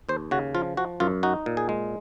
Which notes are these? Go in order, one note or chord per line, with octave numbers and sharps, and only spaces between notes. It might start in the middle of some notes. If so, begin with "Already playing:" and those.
D#2 C5
C#3 F#4
F3 F4
F3 F#4
F#2 F4
D#4 F#4
A#2
G#4
G#3